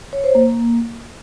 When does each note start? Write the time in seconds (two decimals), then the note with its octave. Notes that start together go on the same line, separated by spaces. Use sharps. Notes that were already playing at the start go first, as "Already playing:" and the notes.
0.13 C#5
0.24 C5
0.35 A#3